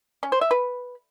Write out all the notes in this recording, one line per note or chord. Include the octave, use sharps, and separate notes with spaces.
C#4
C5
E5
B4